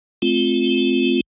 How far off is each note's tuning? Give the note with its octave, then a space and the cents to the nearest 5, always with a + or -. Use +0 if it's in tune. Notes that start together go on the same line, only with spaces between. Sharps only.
A3 -25 C4 +0 F4 +0